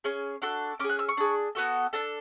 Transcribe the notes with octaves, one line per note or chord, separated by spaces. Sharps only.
C#4 G#4
D4 F#4 A4
C#4 G#4 D6
F#6
E6
C#6
D4 G#4
B3 F#4 A4
D4 A4 A5